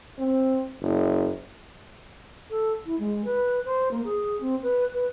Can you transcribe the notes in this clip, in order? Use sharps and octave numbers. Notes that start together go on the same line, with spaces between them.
C4
F#1
A4
E4
G#3
B4
C5
A#3
G#4
C4
B4
B4